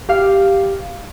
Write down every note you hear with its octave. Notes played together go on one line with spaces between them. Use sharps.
G4 F5